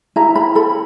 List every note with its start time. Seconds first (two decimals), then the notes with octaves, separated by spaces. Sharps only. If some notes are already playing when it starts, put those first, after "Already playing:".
0.16 E4 A#5
0.35 B5
0.55 A4 B5